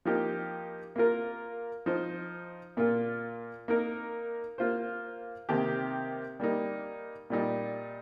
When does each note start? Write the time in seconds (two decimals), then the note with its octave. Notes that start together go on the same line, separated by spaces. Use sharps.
0.05 F3 A#3 D#4 G4
0.96 A#3 F4 A#4
1.86 F3 D#4 C5
2.77 A#2 A#3 F4
3.68 A#3 D#4 A#4
4.58 A#3 F4 C5
5.49 C3 D#3 A#3 G4
6.40 G3 A#3 D#4
7.30 A#2 G3 D#4